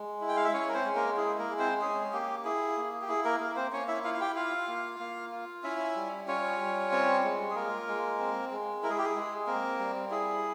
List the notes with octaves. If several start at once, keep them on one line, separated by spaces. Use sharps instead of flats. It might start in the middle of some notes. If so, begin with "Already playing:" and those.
Already playing: G#3
E4
G5
F5
E5
C#4 C#5
A#4
C4 C5
G#3
A#3 A#4
E4 G#4
A#3 A#4
G#3
C4 C5
C#4 G#4
A#3 G4
E4 G#4
A#3
G4
E4 G#4
A#3 A#4
A#3 A#4
C4 C5
A#3 C#4 C#5
E4 E5
E4 F4 F5
F5
G4 G5
F4 F5
A#3
A#3
F4
C#4 E4 E5
G3
C#4 F4 C#5
G3
C4
G#3
G#4
A#3 F4 A#4
G#3
C4
G#3
E4 A#4
G#4
G4
G#4
G#3
A#3 C4 A#4
G3
E4 G#4